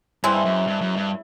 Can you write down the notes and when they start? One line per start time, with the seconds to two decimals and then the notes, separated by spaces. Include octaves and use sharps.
0.24 G2 E3 G#3 C4 E4
0.45 F#2
0.67 G2
0.81 F#2
0.96 G2